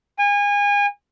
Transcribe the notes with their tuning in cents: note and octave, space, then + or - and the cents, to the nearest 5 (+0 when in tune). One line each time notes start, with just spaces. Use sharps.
G#5 -30